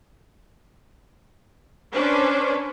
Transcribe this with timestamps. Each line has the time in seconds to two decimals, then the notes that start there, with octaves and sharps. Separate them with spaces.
1.93 C#4 D4 B4 C5